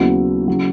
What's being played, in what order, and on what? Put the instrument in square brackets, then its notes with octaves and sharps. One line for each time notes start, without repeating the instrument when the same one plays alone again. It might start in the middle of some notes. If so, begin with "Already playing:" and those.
Already playing: [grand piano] D#2 C#3 F#3 B3 E4
C#3 F#3